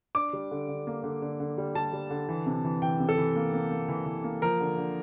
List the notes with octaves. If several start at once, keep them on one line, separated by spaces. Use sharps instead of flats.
D4 D6
G3
D3
D3
A#3
D3
D3
D3
G3
G3 A5
G3
D3
E3
C3
E3
E3 G5
C3
A4
E3
A#3
A#3
A#3
E3
E3
A#3
F3 A#4
D3
D3